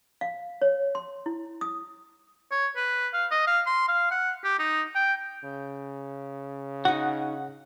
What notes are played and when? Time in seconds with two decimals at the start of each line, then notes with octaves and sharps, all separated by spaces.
0.21 F5
0.62 C#5
0.95 C6
1.26 E4
1.61 D#6
2.52 C#5
2.76 B4
3.14 F5
3.31 D#5
3.47 F5
3.67 C6
3.88 F5
4.11 F#5
4.44 G4
4.59 D#4
4.95 G5
5.44 C#3
6.85 D#4 F#4 F#5